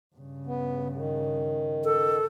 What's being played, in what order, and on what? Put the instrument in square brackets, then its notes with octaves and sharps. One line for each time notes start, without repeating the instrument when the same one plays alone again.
[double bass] G2 C#3
[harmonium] B3
D#3
[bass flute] A4